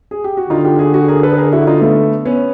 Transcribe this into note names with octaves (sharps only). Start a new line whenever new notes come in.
G#4
G4
F#4
D3 D#4 F4
F4 G4
F#4 G#4
F#4 G#4
G#4 A#4
A4 B4
B4
G#4 A#4
E4 F#4
D#4 F4
A3 B3
B3 C#4